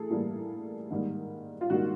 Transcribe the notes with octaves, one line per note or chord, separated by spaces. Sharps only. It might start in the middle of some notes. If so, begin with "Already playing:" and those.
Already playing: A2 E3 G#4 A4
A2 E3 G3 A#3
G#2 D#3 G3 A#3
F4
G#2 D#3 G3 A#3 F#4